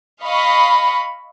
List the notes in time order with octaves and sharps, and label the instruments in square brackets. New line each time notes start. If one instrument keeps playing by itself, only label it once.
[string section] D#5 F5 B5 C#6